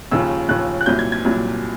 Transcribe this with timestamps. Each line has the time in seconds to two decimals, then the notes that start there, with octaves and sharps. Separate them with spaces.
0.11 D#2 C#3 F3 E6
0.49 D#2 C#3 F3 F#6
0.81 F#6
0.86 C2 A#2 F#3 G6
0.99 G#6
1.12 G#6
1.25 C2 A#2 F#3